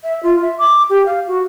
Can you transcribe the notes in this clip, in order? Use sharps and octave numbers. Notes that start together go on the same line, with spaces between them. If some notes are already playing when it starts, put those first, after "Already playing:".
E5
F4
E5
D6
G4
F5
F#4